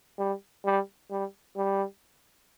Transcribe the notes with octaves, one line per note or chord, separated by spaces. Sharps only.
G3
G3
G3
G3